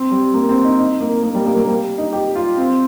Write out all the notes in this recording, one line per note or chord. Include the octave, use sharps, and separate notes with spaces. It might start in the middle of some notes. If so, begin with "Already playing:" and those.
Already playing: C4
G3
A#3
C4
D#4
D#4
A#3
A#3
G3
A#3
A#3
G3
D#4
G4
F4
C4